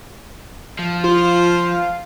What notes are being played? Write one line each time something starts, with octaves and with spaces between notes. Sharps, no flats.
F3
F4 C5